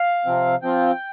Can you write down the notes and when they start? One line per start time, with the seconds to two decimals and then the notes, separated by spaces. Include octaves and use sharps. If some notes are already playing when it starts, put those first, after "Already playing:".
Already playing: F5
0.25 C3 F3 C4
0.62 F3 C4 F4 G5